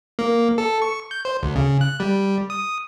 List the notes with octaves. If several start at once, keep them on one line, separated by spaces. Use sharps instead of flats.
A#3
A4
C#6
G6
C5
D2
C#3
F#6
G3
D#6